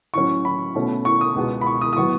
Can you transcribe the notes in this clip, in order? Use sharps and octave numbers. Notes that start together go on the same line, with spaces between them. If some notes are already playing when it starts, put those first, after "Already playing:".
A2 F#3 C#4 C#6
B5
B2 A3 C#4
C#6
D#6
C#2 B2 G#3 B3
B5
C#6
D#6
D#6
A2 F#3 B3 C#6